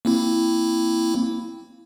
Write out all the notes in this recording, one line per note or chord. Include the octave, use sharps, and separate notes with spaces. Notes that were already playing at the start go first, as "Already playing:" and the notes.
A#3 C4 E4